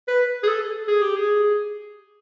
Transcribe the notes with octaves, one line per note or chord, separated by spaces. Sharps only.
B4
G#4
A4
G#4
G4
G#4